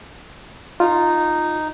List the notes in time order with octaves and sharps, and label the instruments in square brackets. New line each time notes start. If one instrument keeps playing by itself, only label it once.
[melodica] D#4 [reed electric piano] F4